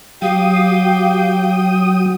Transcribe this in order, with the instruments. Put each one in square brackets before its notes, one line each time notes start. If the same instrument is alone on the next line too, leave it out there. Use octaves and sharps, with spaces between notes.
[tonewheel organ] F#3 D#6 [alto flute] G4 [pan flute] F5 [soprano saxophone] G5